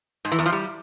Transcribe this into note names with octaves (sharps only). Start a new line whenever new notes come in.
G#2
E3
E2
F3
G3